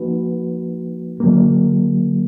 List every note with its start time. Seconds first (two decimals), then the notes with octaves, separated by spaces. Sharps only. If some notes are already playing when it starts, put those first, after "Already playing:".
Already playing: F3 A#3 D#4 F#4 B4
1.20 D3 F#3 A#3